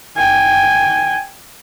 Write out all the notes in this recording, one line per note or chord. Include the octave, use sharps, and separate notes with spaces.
G5 G#5